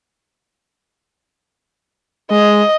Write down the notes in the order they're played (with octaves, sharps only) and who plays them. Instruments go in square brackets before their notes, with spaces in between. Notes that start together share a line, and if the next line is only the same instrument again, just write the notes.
[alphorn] G#3 [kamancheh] D#5